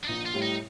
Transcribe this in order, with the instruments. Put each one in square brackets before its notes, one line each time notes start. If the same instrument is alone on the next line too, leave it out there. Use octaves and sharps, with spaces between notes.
[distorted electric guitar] D4
[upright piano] A#1 [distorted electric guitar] D#4
[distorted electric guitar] F4
[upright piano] A2 G3
[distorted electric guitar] D#4